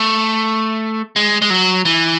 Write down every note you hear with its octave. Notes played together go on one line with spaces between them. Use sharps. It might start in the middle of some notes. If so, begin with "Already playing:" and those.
Already playing: A3
G#3
G#3
F#3
E3